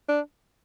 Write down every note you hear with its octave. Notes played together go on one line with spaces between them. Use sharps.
D4